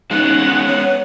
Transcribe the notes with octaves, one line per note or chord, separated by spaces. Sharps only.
G#3 B3 C#4 D#4 F#5
C#5